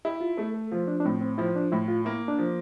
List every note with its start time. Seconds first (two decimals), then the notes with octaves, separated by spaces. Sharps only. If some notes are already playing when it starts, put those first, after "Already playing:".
0.05 E4 G4
0.21 F4
0.37 A3 A4
0.54 A4
0.72 F3 F4
0.88 D4
1.00 D4
1.04 A2 C4
1.21 C4
1.38 F3 E4
1.55 D4
1.72 A2 E4
1.88 F4
2.05 A#3 E4
2.28 D4
2.39 F3